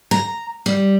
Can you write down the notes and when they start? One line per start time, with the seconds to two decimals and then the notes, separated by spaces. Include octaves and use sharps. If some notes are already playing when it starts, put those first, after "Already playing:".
0.11 A#5
0.66 G3